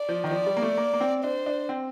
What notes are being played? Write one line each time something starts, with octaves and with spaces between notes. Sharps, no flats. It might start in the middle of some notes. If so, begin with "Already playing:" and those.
Already playing: D5
F3
D#3
F3 D5
G3
A#3
A3
A#3
A#3
C4
D4 C5
D4
C4